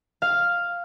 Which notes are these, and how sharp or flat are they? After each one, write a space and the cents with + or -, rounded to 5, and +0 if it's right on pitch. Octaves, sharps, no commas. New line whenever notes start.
F5 +0